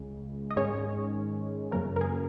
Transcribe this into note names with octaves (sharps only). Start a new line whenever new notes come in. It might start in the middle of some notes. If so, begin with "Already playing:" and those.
Already playing: C#2 C#3 G#3
D#5
G#2 D#3 G#3 C#4 C#5
F#2 C#3 F#3 A#3 C#4 A#4
A#4
G#4